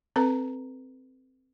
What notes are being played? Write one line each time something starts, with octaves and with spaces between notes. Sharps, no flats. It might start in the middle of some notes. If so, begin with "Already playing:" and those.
C4 A4 B4 A#5